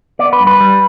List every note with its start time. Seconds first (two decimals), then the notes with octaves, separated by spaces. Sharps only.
0.19 B3 D5
0.33 B4
0.40 G2
0.47 B4
0.60 G3